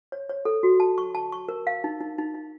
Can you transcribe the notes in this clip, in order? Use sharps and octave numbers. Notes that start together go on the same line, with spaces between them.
C#5
C#5
A4
F#4
A5
C#6
A5
C#6
A#4
F5
D#4
D#4
D#4
D#4